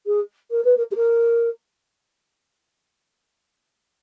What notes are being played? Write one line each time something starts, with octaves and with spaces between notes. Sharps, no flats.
G#4
A#4
B4
A#4
G#4
A#4